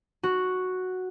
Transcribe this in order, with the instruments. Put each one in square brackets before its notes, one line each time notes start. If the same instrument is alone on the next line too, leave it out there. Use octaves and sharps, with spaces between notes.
[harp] F#4